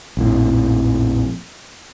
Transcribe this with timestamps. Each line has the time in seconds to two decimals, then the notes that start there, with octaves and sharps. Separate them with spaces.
0.17 A#1 F2 A2